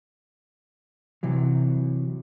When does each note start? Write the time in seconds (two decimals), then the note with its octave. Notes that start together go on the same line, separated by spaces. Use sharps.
1.23 C3 E3 F#3